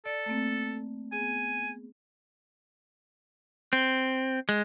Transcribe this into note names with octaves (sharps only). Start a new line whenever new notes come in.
A4 D5
A3 A#3 C4
B3 G#4 G#5
C4
G#3